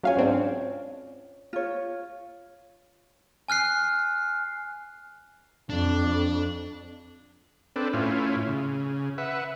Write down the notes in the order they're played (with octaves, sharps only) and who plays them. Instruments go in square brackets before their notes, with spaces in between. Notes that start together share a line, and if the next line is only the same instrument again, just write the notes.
[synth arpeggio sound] F#3 F5 G#5 [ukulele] C#4 F4 C#5
[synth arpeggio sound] G#2 C4 D4
[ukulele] F4 C#5
[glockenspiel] G#5 F6 F#6 C7
[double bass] F2 [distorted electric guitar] D4
[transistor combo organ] C4 D4 A4 B4
A2 C#4 E4 F4
C#3
B4 E5 F#5